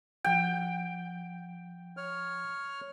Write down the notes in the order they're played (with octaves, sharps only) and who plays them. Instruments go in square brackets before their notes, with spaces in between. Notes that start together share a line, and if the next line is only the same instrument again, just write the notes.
[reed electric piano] F3 F#5 [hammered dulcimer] G5
[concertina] C#5 F6